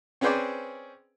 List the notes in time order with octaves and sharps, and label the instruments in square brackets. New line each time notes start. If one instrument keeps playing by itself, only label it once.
[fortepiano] C4 C#4 G#4 B4 C5 D5